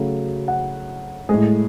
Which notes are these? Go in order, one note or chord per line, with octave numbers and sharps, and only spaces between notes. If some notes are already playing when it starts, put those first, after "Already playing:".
Already playing: C#3 F#3 A3
F#5
A2 G#3 G#4